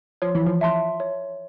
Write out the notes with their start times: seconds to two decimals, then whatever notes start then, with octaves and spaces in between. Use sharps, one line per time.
0.22 F3 C#5
0.35 E3
0.47 F3
0.61 E5 A5 C6
1.00 C#5